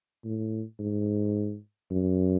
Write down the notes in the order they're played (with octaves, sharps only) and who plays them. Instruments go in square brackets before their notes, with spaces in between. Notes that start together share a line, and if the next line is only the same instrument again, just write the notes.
[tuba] A2
G#2
F#2